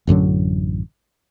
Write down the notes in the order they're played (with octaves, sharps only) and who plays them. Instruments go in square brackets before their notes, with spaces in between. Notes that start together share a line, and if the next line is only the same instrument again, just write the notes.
[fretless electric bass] A1 F#2 D3 F#3